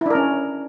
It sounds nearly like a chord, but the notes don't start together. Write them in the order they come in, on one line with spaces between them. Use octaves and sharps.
E4 D4 A#4 C#4